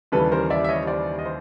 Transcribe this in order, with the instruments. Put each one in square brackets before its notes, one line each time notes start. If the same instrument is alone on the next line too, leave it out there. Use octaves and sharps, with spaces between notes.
[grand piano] D#2 C#3 E3 G3 A4 B4
A#4 C5
D5 E5
E5
C#5 D#5
C5 D5
D#5
C5